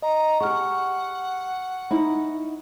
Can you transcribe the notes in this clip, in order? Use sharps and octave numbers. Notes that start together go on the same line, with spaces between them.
D#5 A#5
G4 G#4 F#5 C#6 F6
D#4 E4